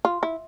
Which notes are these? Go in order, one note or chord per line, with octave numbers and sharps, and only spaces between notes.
F4
E4